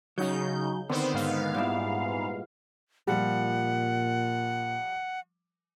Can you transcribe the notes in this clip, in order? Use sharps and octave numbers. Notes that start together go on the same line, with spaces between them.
C#3 F#3 D#4 G6
D3 D#3 B3 C4 C5
G#2 B3 F5
A#2 G3 E4
A#2 F3 G3 F#5